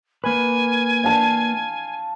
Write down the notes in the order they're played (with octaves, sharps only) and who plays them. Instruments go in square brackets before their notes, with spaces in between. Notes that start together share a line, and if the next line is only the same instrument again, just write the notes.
[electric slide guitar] A#3 B4 [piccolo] G#5
[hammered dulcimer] F5 A5